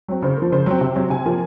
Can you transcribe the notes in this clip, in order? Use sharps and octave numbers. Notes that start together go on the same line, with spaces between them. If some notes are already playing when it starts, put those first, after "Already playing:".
F#3 C4
C#3 C5
F3 A#3
C#3 C5
F#3 C4
C3
F#3 C4
C3 G#5
F3 A#3